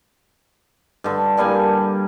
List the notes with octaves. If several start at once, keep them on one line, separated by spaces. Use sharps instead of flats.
G2 D3
G2 G3 A#3 G#5